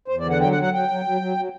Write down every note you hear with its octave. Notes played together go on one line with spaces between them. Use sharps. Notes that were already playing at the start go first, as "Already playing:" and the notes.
E2 C5
D5
D3
F#5
F#3 G5
F#5
F#3
F#5
F#3 G5
F#3
F#3
F#3
F#3